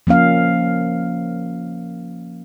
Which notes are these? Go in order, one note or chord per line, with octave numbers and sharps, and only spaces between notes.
F3 A#3 C#4 F5